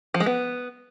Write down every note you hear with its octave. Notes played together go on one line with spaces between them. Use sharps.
F3
G#3
B3